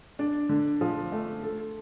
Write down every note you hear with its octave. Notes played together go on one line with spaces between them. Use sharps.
D4
D3
F3
A3
A4